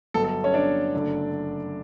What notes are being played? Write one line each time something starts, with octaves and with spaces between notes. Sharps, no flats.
G1 G2 F#3 B3 A4
A4
C#4 C#5
D4 D5
F#1 F#2 D3 A3